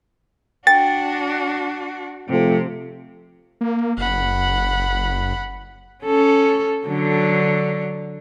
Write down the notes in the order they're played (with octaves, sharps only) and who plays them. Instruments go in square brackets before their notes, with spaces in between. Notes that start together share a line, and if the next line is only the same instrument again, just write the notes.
[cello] D4 F#4 [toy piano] G5 [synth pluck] A6
[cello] C3 [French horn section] F3 A3 C4
[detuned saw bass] A#3
[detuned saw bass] F#1 [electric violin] F#5 B5
[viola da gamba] C#4 A4
D3 F#3 D4